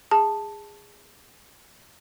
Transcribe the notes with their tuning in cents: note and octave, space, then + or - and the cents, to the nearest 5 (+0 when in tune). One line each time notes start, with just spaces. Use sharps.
G#4 -15 A5 +0